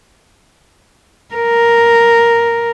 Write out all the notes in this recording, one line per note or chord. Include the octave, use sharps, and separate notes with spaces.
A#4